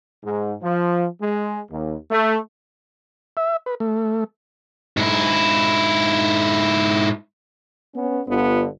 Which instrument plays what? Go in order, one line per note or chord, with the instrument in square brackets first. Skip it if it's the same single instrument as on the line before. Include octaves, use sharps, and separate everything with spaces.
[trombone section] G#2
F3
G#3
D#2
A3
[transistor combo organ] E5
B4
A3
[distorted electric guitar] G#2 E4
[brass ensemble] B3 C#4
G1 D3 B3 F4